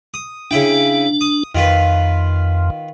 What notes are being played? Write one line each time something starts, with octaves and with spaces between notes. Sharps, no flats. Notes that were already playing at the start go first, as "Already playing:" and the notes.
D#6
C#3 D4 E4 G5
D#6
F2 D#3 F4 B4